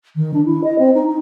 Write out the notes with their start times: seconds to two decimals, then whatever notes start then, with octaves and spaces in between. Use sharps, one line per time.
0.16 D#3
0.33 D4
0.45 E4
0.63 D#5
0.78 C4
0.94 D#4
1.07 D#4